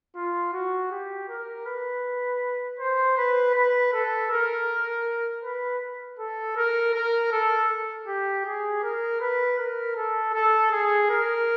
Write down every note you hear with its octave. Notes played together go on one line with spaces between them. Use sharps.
F4
F#4
G4
A#4
B4
C5
B4
B4
A4
A#4
B4
A4
A#4
A#4
A4
G4
G#4
A#4
B4
A#4
A4
A4
G#4
A#4